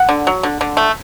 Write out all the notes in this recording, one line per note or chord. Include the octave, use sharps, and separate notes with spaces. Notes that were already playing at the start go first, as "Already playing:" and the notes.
Already playing: F#5
D3
F#3
D3
D3
A3